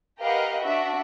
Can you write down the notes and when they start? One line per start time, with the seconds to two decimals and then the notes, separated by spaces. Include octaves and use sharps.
0.20 G4 A#4 B4 D#5 F5 F#5
0.60 D4 F#4 E5